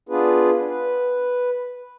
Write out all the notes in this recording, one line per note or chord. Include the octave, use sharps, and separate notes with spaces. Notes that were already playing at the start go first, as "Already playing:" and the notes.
B3 D4 F4 G#4 B4
B4